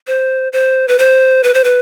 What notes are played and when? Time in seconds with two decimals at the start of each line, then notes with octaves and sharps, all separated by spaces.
0.07 C5
0.53 C5
0.88 B4
0.99 C5
1.43 B4
1.54 C5
1.64 B4